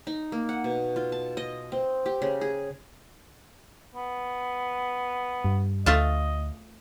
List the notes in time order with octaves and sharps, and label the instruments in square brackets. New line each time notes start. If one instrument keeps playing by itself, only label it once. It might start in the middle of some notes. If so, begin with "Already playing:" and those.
[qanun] D#4
A#3
F#5
B2
F4
A5
D#5
C4
G4
C#3
G#4
[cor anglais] B3
[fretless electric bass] G2
[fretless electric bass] D2 [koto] A3 F4 A5 [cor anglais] D#5